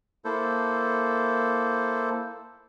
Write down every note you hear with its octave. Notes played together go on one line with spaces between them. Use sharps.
A#3 E4 A4 C5